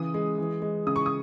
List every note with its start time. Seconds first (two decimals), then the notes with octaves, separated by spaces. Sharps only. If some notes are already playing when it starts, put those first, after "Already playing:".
Already playing: C#3 E3 D#6
0.14 G#3
0.38 E3
0.62 G#3
0.87 C#3 D#6
0.96 C#6
1.06 D#6